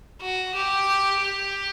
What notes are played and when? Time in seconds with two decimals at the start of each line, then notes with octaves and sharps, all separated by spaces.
0.22 F#4
0.55 G4
1.19 G4